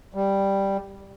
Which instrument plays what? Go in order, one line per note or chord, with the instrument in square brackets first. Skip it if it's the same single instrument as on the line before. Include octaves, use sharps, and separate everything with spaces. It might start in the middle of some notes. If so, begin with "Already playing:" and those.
[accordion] G3